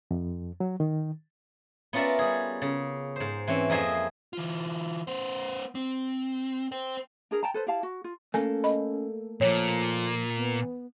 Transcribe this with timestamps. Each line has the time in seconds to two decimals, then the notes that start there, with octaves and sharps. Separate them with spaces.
0.11 F2
0.60 F#3
0.80 D#3
1.93 B3 C#4 F4 A#4 D5 E5
2.19 G3 G#4
2.62 C#3
3.16 G#2 C5
3.48 E3 C4 C#4
3.70 F2 A#3 C4 G#4 D#5 E5
4.33 E3 F4
5.07 B3 C5
5.75 C4
6.72 C5 G5
7.31 D4 G#4 A#4
7.43 G5 A5 A#5
7.54 A4 B4 C5
7.67 E4 G4 F5 A5
7.83 F#4
8.04 F4
8.34 A3 A#3 C#4 A4 G#5
8.64 D#5 B5
9.41 A#2 F3 C#5
10.37 B3